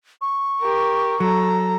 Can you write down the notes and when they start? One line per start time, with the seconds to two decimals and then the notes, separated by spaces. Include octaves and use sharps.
0.21 C#6
0.61 G4 A#4
1.20 F#3 A4 A#5